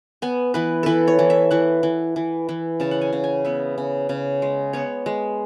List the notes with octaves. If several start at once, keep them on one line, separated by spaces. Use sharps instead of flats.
B3 G#5
E3 B4
E3 A4 B4
C#5
E3
E5
E3 F#5
E3
E3
E3
C#3 A5
F#5
G#5
C#3
G#5
B3 E5
C#3
C#3
G#3
B3 C#5
G#3